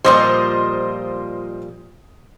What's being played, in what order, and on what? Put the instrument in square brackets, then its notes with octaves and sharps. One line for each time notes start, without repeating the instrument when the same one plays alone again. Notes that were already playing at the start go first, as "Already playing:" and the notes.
[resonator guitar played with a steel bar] A#2 F3 G3 [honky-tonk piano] C5 D#5 C6